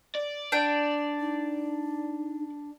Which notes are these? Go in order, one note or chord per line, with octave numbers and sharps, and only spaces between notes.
D5
D4 G5
D#4